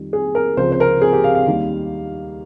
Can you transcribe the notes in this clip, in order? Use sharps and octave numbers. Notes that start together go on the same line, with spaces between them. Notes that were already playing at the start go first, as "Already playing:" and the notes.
Already playing: F2 D#3 G3
G#4
A#4
C#2 C3 F3 G#3 C5
C5
A#4
G#4
G4
F5
F5
D#2 D#3 G3